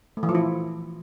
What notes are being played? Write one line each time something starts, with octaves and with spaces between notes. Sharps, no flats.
A3
E3
F3
E4